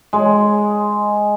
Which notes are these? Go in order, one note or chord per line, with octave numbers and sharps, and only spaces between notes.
G#3